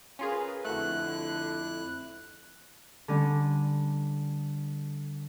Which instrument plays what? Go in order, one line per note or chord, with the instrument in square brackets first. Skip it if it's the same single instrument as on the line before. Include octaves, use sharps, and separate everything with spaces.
[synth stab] C#4 F4 G#4 [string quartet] A#4 B4 [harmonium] F5
[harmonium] F2 E4 [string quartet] D3 [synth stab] A3 F#4 [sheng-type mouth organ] F#6
[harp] D3 G3 C#4